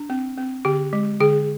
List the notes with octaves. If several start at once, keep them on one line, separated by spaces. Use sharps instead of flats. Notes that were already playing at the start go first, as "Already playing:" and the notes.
Already playing: D4
C4
C4
D3 G4
G#3
D3 G#4